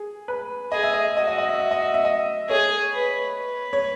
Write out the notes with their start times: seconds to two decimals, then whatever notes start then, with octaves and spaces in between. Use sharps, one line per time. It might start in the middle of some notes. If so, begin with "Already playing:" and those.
Already playing: G#4
0.28 B4
0.72 G#4 D#5
0.83 E5
0.93 D#5
1.17 F#4 D#5
1.28 D#5
1.38 D#5
1.49 E5
1.60 E5
1.71 D#5
1.82 E5
1.94 E5
2.05 D#5
2.49 G#4 C#5
2.93 B4
3.39 B4
3.73 C#5